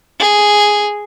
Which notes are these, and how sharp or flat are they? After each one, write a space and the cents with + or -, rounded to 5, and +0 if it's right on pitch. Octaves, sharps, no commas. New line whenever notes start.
G#4 +0